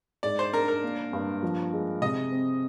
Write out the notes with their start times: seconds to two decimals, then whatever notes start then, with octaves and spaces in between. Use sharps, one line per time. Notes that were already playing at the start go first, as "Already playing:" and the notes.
0.23 G#2 D5
0.39 C5
0.53 D4 A#4
0.68 A#4
0.83 A#3
1.13 G2
1.43 F3
1.73 G#3
2.01 C3 D#5
2.32 C4